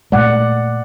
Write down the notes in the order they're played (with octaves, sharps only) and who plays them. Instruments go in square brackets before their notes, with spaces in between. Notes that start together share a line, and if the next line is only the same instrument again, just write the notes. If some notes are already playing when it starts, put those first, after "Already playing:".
[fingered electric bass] A#2 G#3 A3 [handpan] D5 F#5